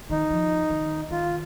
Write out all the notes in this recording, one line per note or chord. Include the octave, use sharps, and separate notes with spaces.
D#3 D#4
F3
D#3
D#3 F4